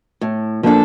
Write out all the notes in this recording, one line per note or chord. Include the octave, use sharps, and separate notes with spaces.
A2
F3 A#3 D4 A4